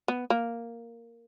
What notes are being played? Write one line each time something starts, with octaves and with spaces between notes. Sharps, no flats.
B3
A#3